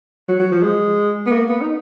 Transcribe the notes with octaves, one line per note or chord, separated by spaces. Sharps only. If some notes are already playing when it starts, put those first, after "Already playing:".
F#3
F#3
F3
G#3
B3
A#3
B3
D#4